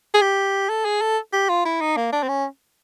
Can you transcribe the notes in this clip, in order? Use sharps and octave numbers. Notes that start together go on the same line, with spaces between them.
G#4
G4
A4
G#4
A4
G4
F4
E4
D#4
A#3
D4
C4
C#4